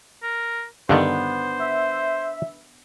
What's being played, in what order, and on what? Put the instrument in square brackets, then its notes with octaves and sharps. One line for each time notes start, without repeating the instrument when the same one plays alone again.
[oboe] A#4
[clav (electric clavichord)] G2 D3 D#3 [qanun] B3 D4 [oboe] C5
[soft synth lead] E5